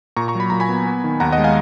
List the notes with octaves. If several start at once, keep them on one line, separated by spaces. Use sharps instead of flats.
A#2 A#5 C#6
A#5 C#6
F#3 B5
A#2 A#5
G#5 B5
B3
B3
D#3
D#2 F#5 A#5
D#5 F#5
G#3
F5 G#5